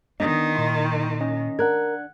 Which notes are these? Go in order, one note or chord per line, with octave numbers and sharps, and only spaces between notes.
D#3 B3 D4 D#5 D#6
A#2 D#4 E4 C6
C#4 D#5
D4 A#4 F#5 F#6 G#6